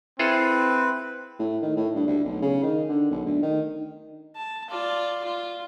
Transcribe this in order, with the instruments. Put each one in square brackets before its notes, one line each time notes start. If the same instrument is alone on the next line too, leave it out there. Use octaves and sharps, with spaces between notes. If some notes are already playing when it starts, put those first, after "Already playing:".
[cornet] C4 [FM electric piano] E4 [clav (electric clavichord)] F4 G#4 A4 [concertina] B4
[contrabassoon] A2
D#3
A2
G2
D2
B1
C#3
D#3
D3
B1
D2
D#3
[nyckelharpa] A5
F4 D5
F4